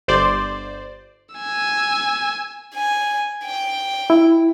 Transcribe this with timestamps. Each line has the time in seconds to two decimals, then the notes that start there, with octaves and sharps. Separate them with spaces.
0.08 G1 C5 D5
1.35 G#5 E6
2.75 G#5
3.46 G5
4.10 E4